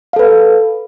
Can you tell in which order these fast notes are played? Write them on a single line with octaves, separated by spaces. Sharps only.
F5 A4 B4